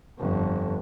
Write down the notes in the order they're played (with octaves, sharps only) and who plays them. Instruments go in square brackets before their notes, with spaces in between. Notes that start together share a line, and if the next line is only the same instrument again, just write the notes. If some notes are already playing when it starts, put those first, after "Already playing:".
[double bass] G1 F2